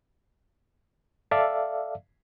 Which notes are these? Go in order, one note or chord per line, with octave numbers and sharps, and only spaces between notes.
A4 D5 E5 F5